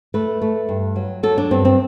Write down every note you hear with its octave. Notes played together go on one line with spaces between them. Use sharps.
A3 B4
A3
G2
F#3
F#3 A4
D4
G2 C4
C4